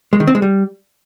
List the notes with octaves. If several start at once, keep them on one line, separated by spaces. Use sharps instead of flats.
G#3
D#3
C4
G#3
G3